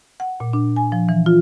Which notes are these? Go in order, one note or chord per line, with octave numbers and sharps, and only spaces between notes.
F#5
A#2
D4
G#5
F3
E3
F4